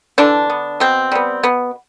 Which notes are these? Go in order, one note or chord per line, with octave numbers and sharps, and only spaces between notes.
D3 E3 D4
B3
B2 C4
G3 B3
B2 B3